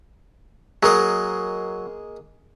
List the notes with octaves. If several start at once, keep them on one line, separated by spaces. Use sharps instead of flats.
F#3 G#3 A#3 D#5